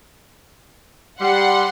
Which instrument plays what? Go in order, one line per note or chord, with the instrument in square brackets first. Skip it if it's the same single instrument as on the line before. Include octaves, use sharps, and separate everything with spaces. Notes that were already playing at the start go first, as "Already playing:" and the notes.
[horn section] G3 [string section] F#5 C6